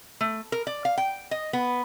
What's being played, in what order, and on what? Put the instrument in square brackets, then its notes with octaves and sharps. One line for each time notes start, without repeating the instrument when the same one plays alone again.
[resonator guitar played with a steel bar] A3
A#4
D5
F5
G5
D#5
B3